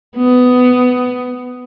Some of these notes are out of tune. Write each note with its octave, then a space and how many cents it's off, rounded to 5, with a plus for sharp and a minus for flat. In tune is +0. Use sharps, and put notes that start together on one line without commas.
B3 +15